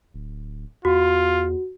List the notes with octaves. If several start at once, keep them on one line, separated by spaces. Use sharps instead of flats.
D1
E2 F4 F#4